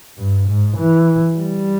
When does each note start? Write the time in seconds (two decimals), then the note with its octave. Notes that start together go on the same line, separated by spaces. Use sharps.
0.18 G2
0.49 G#2
0.77 E3
1.37 G3